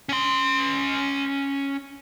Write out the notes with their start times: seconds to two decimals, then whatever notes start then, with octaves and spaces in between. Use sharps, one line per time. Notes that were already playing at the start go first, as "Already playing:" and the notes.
0.09 C#4 C6